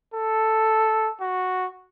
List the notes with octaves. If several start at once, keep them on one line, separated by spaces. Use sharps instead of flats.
A4
F#4